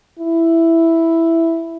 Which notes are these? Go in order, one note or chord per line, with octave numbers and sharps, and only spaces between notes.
E4